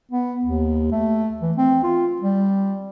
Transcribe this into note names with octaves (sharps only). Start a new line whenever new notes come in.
B3
D#2
A3
E3
C4
F4
G3